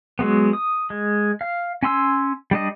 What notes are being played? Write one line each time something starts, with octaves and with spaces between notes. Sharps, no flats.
F#3 G#3 B3
D#6
G#3
F5
C#4 G#5 C6 E6
G3 D4 D#5